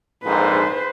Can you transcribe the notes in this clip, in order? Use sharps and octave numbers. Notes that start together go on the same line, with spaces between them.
A#1 F2 G#2 B4 C5